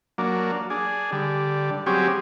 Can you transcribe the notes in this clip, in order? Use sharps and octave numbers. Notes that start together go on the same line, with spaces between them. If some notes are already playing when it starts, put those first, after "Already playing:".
F#3 A#3 D4
D4 G#4
D3 G3
F#3 G3 C4 C#4 G4 G#4